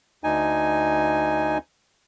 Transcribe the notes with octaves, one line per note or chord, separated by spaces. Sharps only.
D2 D#4 G#5